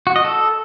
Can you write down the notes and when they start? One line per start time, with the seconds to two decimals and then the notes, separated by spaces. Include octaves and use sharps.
0.07 F#4
0.16 D#5
0.25 A4